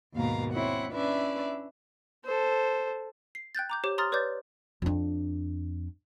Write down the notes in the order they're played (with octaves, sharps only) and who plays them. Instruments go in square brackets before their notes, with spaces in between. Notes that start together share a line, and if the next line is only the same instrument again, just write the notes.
[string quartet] D#2 G#2 B2 A#3 F5 A#5
C4 E4 C#5 F#5
C#4 D4 E4 B4 D5 E5
[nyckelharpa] A4 C5
[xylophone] C7
G5 F#6 G6 A6
A#5 D6 G6
G4 C5 C#5 D6
A#5 C6 D#6 F6 A6
B4 C#5 D5 D6 G6 A6
[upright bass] F2 D4